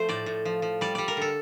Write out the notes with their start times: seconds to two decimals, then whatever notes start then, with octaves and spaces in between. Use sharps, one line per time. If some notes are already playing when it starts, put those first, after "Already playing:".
Already playing: F3 A3 C5
0.09 A2 D5
0.26 A2
0.45 F3
0.62 F3
0.81 G3 D5
0.95 G3 D5
1.08 A#4
1.17 D3 A4